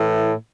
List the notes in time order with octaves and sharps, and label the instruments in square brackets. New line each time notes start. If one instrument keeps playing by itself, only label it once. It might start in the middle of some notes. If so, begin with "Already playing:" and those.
Already playing: [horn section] A2 E3